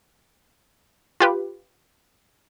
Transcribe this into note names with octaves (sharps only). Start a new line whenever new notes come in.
F4 G4 B4